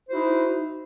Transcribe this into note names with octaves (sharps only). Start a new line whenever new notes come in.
D#4 E4 F#4 C5